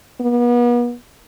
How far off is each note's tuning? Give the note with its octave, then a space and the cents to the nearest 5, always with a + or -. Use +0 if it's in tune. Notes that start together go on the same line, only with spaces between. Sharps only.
B3 -40